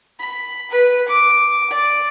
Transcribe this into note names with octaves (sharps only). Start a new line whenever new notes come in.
B5
B4
D6
D5